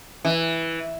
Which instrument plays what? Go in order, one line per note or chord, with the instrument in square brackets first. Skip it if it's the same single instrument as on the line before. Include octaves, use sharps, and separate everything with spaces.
[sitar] E3